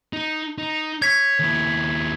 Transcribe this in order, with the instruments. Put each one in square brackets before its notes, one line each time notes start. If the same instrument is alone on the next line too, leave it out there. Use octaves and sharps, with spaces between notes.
[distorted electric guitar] D#4
D#4
[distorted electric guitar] C#5 [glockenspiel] G#6 B6
[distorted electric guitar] D#2 E4